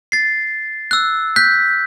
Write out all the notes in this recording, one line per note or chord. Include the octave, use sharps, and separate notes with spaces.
A6 C7
E6 F#6
F#6 G6 B6